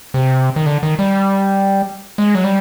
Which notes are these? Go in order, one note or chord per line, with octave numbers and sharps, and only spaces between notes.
C3
D#3
D3
D#3
G3
G#3
F#3
G3